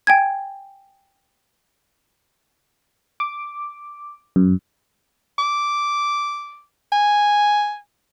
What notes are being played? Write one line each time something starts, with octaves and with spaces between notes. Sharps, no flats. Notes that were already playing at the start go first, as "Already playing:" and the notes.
G5 G#5 G#6
D6
F#2
D6
G#5